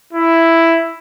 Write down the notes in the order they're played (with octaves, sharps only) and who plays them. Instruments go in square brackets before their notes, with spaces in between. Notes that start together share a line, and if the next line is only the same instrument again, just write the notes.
[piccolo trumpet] E4